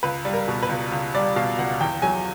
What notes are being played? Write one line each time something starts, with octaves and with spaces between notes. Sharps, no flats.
C#2 B4
G3
A#4
B2
B4
C#2
C#2
G3 D5
B2 F5
C#2 F#5
E2 G5
F#3 G#5